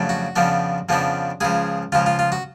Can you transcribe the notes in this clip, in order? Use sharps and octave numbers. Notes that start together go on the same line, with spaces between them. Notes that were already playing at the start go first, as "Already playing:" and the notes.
Already playing: F2 C#3 F#3 A3 D4
F#4
F2 C#3 F3 B3 D4
F2 C#3 F3 B3 D4
C#2 C#3 F3 G#4
C#2 C#3 F3 F4
F4
F4
F#4